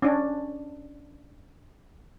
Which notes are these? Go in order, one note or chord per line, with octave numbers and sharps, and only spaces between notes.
C#4 D4